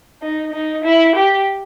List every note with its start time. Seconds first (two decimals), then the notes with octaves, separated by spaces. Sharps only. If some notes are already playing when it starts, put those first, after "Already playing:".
0.22 D#4
0.53 D#4
0.84 E4
1.16 G4